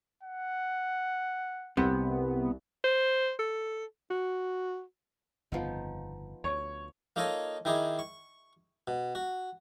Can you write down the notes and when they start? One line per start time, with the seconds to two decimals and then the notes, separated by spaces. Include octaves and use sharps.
0.24 F#5
1.77 C2 C3 B3
2.84 C5
3.39 A4
4.10 F#4
5.52 G1 F2 C#3 F3 B3 D#4
6.44 D2 C#5
7.16 A#3 D#4 F4 A4 C#5 D#5
7.65 D#3 D#4 E4 G#4 D6
7.99 C#6
8.88 B2
9.15 F#4